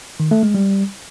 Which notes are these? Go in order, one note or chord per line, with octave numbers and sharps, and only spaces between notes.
D#3
A3
G#3
G3